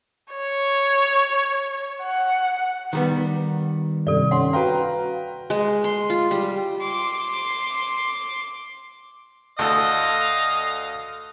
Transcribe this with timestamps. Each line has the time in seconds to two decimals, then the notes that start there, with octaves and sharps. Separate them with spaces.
0.34 C#5
2.03 F#5
2.93 D#3 G3 B3
4.07 G2 C3 A4 D5
4.31 C#4 F#5 C6
4.53 F#4 B4 F5 G5 A#5
5.50 G#3
5.84 C6
6.10 F4
6.31 G3
6.81 C6 D6
9.59 D2 A4 D#5 F5